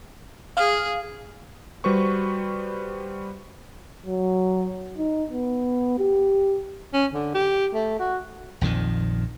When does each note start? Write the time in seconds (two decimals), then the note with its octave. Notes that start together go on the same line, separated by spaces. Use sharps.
0.57 G#4 F5 F6
1.84 G3 F#4 B4 C5 C#6
4.06 F#3
4.98 D#4
5.31 B3
5.99 G4
6.94 C#4
7.13 D3
7.35 G4
7.74 A3
8.00 F#4
8.61 A#1 F2 D#3 F3